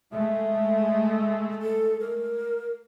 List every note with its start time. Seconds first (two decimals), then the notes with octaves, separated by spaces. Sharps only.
0.12 G#3 A3 E5
1.62 A4
2.00 A#4